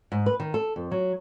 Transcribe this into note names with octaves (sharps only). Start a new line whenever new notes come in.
G#2
B4
D#3
A4
F2
F#3